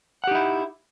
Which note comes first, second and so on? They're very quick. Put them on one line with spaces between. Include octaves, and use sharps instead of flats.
F#5 G4 D#4 E4